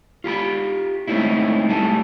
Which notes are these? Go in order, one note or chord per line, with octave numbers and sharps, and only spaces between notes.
F4 G4 A#5 B5
G#3 A3 C4 C#4 D#4 E4
B1 G3 A3 G#5 A5